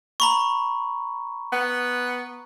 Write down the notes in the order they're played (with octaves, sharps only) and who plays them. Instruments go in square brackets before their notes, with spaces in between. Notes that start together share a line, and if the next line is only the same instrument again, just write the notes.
[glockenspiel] A#5 B5 C#6
[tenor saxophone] B3